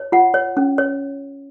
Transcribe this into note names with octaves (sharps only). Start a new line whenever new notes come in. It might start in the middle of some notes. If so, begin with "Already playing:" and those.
Already playing: C#5
F4 F#5
C#5
C#4
C#5